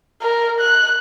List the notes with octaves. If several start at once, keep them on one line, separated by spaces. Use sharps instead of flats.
A#4
F#6